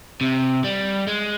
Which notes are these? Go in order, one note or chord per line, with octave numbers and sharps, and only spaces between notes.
C3
G3
G#3